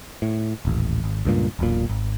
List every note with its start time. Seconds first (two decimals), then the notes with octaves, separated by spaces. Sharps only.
0.22 A2
0.65 D#1 A1
1.04 G#1
1.25 C#2 G2 A#2
1.59 E1 B1 A#2
1.90 G#1